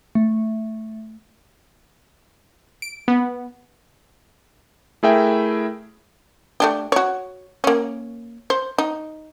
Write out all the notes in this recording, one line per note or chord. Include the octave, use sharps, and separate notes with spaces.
A3
D7
B3
A3 E4 G#4 A#4 E5 G5
A3 D4 G4
F#4 C#5
A#3 C#4
C5
D#4